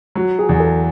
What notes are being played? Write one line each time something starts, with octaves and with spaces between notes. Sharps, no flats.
F#3 F#4
G#4
E2
A4